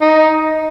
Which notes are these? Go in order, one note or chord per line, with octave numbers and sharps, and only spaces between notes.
D#4